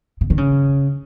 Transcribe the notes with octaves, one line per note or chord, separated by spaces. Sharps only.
C#3
D#3
C#3